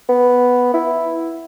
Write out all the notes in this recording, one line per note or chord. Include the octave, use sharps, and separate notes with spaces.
B3
E4